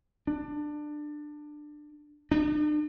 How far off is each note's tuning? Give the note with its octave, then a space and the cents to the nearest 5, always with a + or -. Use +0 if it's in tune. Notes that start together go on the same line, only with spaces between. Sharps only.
D4 +20
D4 +45